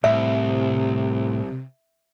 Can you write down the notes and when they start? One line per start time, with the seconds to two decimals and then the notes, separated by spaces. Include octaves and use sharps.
0.04 C2 A2 C3 E5